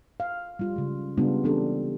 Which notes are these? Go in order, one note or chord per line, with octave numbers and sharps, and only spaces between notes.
F5
G3 F4
C#3 G#3
C#3 G3 G#3 B3 D4 F4
E3 B3 C4 D4 G4 A4